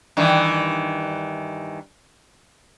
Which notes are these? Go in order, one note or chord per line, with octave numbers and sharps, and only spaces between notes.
G2 D#3 E3